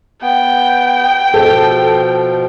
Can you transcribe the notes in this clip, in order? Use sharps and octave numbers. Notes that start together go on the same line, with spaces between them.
B3 G5
B2 F3 A4